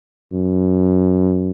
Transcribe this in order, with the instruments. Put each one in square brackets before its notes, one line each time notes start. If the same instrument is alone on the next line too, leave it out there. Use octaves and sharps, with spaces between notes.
[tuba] F#2